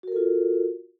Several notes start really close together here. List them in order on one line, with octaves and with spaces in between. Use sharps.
F#4 A#4 A4 F4